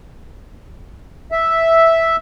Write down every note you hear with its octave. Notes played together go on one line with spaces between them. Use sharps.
E5